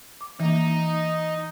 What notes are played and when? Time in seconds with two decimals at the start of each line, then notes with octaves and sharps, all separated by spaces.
0.21 D6
0.40 E3 A#3 D#4